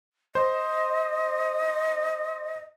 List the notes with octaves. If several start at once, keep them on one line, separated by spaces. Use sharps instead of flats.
C5 D#5